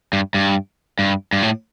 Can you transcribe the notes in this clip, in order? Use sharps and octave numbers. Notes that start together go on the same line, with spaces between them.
G2
G2
G2
G2
A2